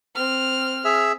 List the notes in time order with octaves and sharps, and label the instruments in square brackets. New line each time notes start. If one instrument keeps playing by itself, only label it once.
[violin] C4 F6
[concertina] G#4 E5 E6